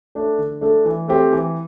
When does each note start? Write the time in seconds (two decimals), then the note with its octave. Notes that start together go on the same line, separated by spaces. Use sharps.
0.15 A3 D4 A4
0.38 D3
0.61 A3 D4 A4
0.85 E3
1.08 A3 C4 G4
1.32 E3